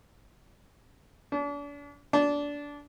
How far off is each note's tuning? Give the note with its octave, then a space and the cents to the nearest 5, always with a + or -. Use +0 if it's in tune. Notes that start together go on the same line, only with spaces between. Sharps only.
D4 -40
D4 -20